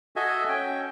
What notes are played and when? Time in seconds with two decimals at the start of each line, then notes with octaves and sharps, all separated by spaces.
0.16 F#4 A4 D#5 E5 G#5
0.49 C#4 G5